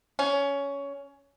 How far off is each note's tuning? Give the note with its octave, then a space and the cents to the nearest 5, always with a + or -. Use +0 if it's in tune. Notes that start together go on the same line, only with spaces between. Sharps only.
C#4 +15